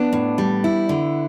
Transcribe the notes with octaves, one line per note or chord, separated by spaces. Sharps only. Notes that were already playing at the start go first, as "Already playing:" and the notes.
Already playing: B3 D4
A2
G3
E4
D3